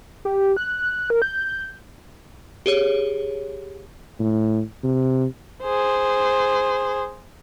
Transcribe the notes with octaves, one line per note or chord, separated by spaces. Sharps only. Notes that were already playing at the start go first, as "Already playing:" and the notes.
G4
F#6
A#4
G6
G4 G#4 C#5
A2
C3
G#4 C5